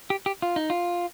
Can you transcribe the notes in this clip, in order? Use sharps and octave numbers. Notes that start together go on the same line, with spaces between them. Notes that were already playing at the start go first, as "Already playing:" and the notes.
G4
G4
F4
D#4
F4